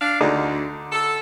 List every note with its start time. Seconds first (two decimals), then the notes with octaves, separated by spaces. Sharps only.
0.01 D4 F5
0.21 D2 D3 D4 D#4
0.92 A4